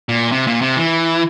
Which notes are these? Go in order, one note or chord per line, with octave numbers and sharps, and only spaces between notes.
A#2
C3
A#2
C3
E3